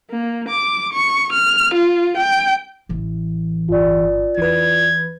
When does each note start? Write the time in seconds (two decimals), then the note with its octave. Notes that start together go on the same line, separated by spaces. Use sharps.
0.11 A#3
0.49 D6
0.93 C#6
1.32 F6
1.74 F4
2.17 G5
2.89 A1 E3
3.69 G1 F4 D5
4.37 E2 E3 B4 G#6